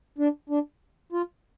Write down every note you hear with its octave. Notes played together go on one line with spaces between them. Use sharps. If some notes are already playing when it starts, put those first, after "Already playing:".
D4
D4
F4